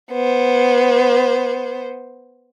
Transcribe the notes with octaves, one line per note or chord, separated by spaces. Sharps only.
B3 C5